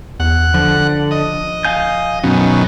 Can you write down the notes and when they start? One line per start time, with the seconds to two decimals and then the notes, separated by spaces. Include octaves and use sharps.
0.20 E2 F#5
0.54 D3 F3
1.11 D#5
1.65 F5 G#5 G6
2.24 F#2 B2 D#3 C#4